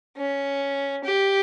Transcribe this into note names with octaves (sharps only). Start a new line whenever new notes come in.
C#4
G4